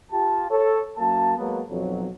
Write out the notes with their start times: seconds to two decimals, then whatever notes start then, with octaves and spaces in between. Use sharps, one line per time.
0.12 F4 G4 A5
0.51 A4 C#5
0.98 F#2 F#3 A#3 A5
1.37 F#3 G#3 A#3 B3
1.70 B1 F2 F#3